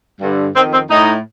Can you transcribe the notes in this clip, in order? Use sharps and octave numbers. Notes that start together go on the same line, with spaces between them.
G2 D3
F2 D#3 C4
C4
A2 D#4